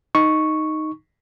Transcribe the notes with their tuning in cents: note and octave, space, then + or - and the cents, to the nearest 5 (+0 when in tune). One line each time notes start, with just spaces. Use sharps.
D#4 +0 C#6 +0